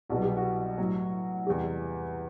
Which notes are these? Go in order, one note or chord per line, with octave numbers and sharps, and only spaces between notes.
C2 B2 F#3 F#4
G4
F#4
A2 F#3
E2 C3 G3 G4